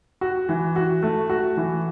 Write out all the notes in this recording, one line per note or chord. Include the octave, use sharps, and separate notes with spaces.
F#4
E3
F#4
A3
F#4
E3